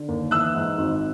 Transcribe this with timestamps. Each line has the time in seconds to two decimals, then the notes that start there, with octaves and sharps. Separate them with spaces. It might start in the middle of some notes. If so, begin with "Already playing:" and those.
Already playing: D3
0.08 D#2
0.31 E3 E6 F#6
0.54 G#2
0.78 G#1